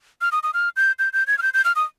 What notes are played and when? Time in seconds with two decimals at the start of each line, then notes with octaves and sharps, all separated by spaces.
0.21 F6
0.32 D#6
0.43 D#6
0.54 F6
0.77 G6
0.99 G6
1.13 G6
1.27 G#6
1.38 F6
1.42 G6
1.54 G6
1.65 F6
1.76 D#6